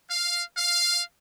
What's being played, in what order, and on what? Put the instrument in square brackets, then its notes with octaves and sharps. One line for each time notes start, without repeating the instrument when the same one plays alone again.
[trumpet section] F5
F5